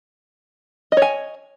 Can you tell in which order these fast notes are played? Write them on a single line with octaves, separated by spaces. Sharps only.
D#5 C#5 G#5